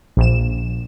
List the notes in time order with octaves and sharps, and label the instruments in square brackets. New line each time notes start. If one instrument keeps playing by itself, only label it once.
[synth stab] A#1 E7